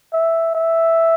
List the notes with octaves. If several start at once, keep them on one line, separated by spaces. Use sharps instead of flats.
E5
E5